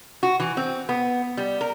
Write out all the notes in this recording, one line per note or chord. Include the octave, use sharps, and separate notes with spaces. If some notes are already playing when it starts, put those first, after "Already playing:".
F#4
E3
C4
B3
G3
A#4